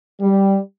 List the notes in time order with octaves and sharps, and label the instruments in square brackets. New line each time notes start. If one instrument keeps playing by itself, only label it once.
[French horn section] G3